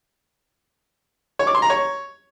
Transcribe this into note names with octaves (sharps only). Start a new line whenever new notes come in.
C#5
D6
C6
A#5
C#5